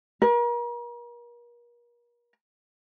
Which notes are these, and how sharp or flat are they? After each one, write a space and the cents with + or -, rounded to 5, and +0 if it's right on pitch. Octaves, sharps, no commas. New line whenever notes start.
A#4 +40